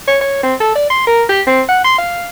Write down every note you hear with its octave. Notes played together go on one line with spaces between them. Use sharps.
C#5
C#5
C4
A4
D5
C6
A#4
G4
C4
F#5
C6
F5